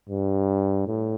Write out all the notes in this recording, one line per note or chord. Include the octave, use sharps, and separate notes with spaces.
G2
A2